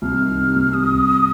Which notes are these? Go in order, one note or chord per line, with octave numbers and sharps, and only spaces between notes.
C2 F6
D#3
C3
C2
C3 D#6
C2